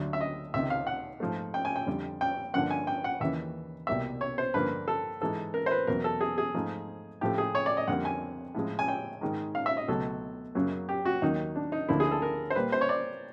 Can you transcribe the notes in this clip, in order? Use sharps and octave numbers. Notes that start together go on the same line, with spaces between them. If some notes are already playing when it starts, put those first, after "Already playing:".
Already playing: D2 D3 F#3
E5
D#5
C#2 C3 D#3 E5
F5
F#5
G#2 F3 A3
G5
G#5
G5
F2 D3 G3
G5
G2 D3 F3 A#3 F#5
G#5
G5
F#5
D#2 C#3 E3 E5
C2 B2 G3 A#3 E5
C#5
C5
G2 D3 F3 A#3 B4
A4
G#2 E3 G#3 A4
A#4
C5
B4
E2 B2 F#3 A#4
A4
G#4
G#4
G#2 F3 A3
A2 F3 A3 G4
G#4
C#5
D5
D#5
F2 D3 G3 A#3 F#5
G#5
A2 F3 G#3
G#5
G5
G#2 D#3 G#3
F5
E5
D#5
C#2 B2 F#3 A3 A4
F#2 C#3 F#3 A#3
G4
F#4
D#2 D#3 F#3 A#3 D#4
D4
D#4
D2 D3 F3 A#3 E4
G#4
A4
A#4
C5
A#2 G3 A#3 B4
C5
C#5
D5